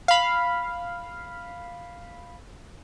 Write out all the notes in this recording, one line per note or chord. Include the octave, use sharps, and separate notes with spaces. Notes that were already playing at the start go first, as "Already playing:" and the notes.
F5 B5